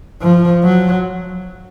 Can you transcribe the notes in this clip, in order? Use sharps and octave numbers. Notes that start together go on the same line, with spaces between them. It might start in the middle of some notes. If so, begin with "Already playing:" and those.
F3
F#3